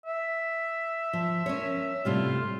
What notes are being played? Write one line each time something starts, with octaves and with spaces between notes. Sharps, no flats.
E5
F3
C#4 A#4 C#5
A2 C3 G3 F4